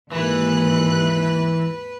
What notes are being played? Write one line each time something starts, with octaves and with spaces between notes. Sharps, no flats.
G#1 D#2 E3 B4 F#6